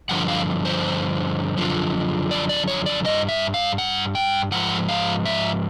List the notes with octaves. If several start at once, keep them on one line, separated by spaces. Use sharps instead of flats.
G2 D3 F3 F#5
F5
C5
F#2 D3 F3
D5
D5
C#5
D5
G2 E3 D#5
E5
F5
F#5
G5
G#2 F3 F#5
F5
E5